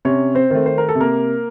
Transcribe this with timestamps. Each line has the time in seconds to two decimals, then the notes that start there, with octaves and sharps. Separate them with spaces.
0.05 C3 C#4 C#5
0.35 C4 C5
0.50 D#3 A3
0.66 C5
0.78 A#4
0.89 A4
0.95 C3
1.01 A#3 A#4